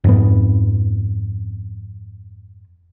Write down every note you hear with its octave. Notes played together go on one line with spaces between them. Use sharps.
F2 G#2 B3